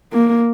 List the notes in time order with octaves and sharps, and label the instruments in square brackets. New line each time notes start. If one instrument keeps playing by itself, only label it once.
[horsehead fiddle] A#3